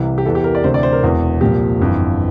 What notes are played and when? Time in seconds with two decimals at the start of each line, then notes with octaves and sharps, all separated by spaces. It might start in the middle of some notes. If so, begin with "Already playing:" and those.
Already playing: C2 C3 E3
0.18 G4
0.26 E2 E3 A4
0.35 G4
0.44 A#4
0.55 D5
0.64 D2 C3 E3 C5
0.74 D5
0.83 C5
0.93 A#4
1.03 E1 E2 E3
1.41 C2 A#2 F3 G4
1.80 G1 F2 E3